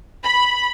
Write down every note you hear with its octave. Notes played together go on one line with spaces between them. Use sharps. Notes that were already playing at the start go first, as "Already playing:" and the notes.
B5